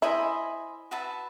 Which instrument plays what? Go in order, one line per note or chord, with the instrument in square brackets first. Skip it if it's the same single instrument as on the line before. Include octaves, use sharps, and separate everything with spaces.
[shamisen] E4 [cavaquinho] C5 D#5 G#5 B5
[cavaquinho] F#4 B4 E5 A5